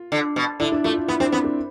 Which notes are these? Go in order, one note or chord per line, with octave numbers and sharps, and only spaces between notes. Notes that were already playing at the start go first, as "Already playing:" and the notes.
Already playing: F4
D3
B2
D3 E4
D4
A3 F4
E4
B3 E4
C4 D4
B3 C4
D4